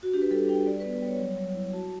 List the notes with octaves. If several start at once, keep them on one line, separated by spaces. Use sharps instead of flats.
F#4
D4 G4
B4
G3 A4
D4 G5
G3 D5
B4
B3
B4
G3 C#5
F#3
F#3
E4
F#4 A5